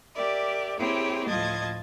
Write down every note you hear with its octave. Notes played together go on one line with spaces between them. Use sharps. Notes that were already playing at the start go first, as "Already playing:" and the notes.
G4 A#4 D5 E5
C4 E4 G4 G#4 A#4 C#5
D2 A2 F3 D#5 A5 G#6